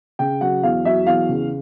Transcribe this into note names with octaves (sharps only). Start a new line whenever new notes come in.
C#3 G5
F#3 F#5
E2 F5
F#3 E5
E2 F5
C#3